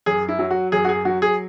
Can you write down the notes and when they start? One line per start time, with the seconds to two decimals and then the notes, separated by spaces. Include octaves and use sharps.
0.06 F#2 G#4
0.29 E4
0.39 F#3
0.51 F#4
0.72 F#2 G#4
0.85 F#4
0.89 G#4
1.05 F#3 F#4
1.22 G#4